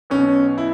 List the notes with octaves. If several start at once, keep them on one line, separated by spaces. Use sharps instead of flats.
B1 B2 C#4
E4